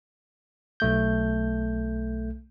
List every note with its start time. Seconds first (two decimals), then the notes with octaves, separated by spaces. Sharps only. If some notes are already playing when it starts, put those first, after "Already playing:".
0.80 B1 A3 G6